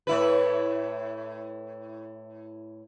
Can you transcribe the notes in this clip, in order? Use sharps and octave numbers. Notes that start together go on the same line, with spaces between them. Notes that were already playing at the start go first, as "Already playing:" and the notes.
A2 E4 B4